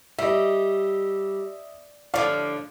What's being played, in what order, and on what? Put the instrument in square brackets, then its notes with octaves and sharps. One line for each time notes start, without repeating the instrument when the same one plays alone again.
[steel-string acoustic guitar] G3 [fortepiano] D#5 E5
[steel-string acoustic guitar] A2 D3 F3 [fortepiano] D5 F5